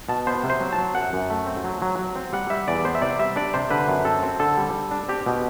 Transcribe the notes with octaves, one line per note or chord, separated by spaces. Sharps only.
B2 A5
B3 C5
C3
C5
F#3
A5
F#3
F#2 F#5
F#2
A3
C4
F#3
F#3
F#3
C4
G3 F#5
G3 E5
E2 D5
B3 C5
E5
C3 D5
G3 E5
D4 D5
C3 C5
D3 B4
F#2
C4 A4
C4
D3 A4
G3
G3
D4
C4 G4
B2